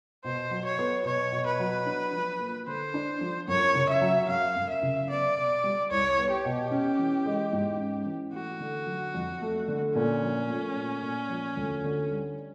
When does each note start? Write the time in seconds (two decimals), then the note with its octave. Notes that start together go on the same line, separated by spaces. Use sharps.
0.24 B2 C5
0.51 F#3
0.65 C#5
0.79 B3
1.05 B2 C#5
1.32 B2
1.46 B4
1.60 F#3
1.86 D4
2.13 F3
2.40 A#3
2.67 D3 C5
2.94 D4
3.21 F3
3.48 F#2 C#5
3.75 C#3
3.89 E5
4.02 F#3
4.29 F#2 F5
4.56 F#2
4.69 E5
4.83 C#3
5.09 B3 D5
5.37 B2
5.64 G3
5.91 C2 C#5
6.18 B3
6.31 G4
6.45 B2
6.71 C#4
6.99 E3
7.26 G#3
7.53 G#2
7.80 C#4
8.06 E3
8.33 A3 F#4
8.60 D3
8.87 F#3
9.14 F2
9.42 A3
9.68 D3
9.95 A#2 C#4
10.23 F3
10.50 A3
10.76 A#2
11.02 A#2
11.30 F3
11.57 D2
11.84 D3
12.11 G3